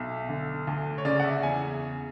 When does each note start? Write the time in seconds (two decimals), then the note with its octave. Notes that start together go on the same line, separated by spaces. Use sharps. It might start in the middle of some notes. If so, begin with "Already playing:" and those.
Already playing: B1 E5
0.29 D3
0.67 D2
0.98 C#5
1.05 C#3 D5
1.20 F#5
1.24 E5
1.43 E2 G#5